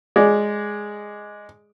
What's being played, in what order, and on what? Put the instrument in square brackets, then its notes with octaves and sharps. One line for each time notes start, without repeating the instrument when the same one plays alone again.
[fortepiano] G#3 D5